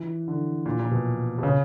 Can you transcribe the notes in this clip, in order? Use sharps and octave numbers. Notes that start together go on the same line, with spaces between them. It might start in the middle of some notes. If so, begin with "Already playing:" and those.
Already playing: E3
D3
A#2
A#2
B2
B2
C#3